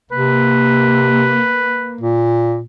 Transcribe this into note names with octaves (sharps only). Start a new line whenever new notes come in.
C3 A#3 B4
A#2